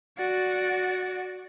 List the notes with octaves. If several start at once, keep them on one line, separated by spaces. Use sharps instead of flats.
F#4 D5